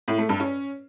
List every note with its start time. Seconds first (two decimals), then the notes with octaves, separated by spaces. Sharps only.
0.08 A2
0.18 A3
0.29 G2
0.40 C#4